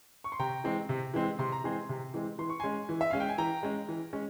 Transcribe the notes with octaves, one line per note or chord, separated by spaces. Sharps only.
C#6
C6
C3 G5 A#5
E3 G#3 C4
C3
E3 G#3 C4
C3 C6
A#5
E3 G#3 C4 G#5 C6
C3
E3 G#3 C4
E3 C6
C#6
G#3 C#4 G#5 C6
E3
E5
G#3 C#4 F5
G5
G#5
E3 G5 A#5
G#3 C#4
E3
G#3 C#4